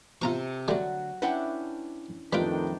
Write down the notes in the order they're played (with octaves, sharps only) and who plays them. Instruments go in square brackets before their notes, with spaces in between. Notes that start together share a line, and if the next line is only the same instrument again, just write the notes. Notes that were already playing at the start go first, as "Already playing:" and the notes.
[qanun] C3 A4 [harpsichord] F4 A#5 C#6
[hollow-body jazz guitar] D2 D5 [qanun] F#3 F#4 [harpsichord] G3 A3
[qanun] C#4 D4 E4 [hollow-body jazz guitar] B4 F#5 G5
[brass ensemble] F2 A2 D#3 [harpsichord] G3 F4 [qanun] D4 G5 [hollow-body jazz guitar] B4